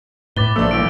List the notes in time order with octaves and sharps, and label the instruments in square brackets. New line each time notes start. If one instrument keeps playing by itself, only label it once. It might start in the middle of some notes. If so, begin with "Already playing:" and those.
[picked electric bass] A2 [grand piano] B4 [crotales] D6 A6 G7
[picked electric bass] A#1 F3 A#3 [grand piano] A3 D4 [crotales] E6
[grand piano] D#1 A2 [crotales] E6 D7